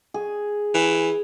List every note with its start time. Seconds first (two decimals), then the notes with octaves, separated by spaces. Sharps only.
0.14 G#4
0.74 E3